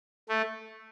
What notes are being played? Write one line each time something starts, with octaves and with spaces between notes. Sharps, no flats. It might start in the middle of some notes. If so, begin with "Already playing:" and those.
A3